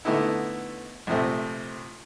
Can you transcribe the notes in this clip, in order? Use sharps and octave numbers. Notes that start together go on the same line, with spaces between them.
D3 A3 B3 D#4 E4
A#1 C3 F3 A3